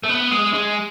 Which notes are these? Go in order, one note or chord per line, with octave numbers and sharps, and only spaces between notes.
A3
B3
G#3
G#3